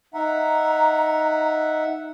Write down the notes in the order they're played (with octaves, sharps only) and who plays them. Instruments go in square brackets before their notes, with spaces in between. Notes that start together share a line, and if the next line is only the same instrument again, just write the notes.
[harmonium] D#4 E5 F#5 [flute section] A#5